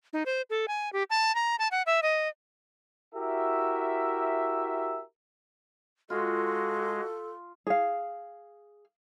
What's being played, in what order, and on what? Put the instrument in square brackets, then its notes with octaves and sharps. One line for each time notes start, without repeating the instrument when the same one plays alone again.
[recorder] D#4
C5
A4
G#5
G4
A5
A#5
A5
F#5
E5
D#5
[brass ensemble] E4 F#4 G4 A#4 E5
[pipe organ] G#3 [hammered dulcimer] F4 [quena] F#4 [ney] A4
[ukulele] G#4 F5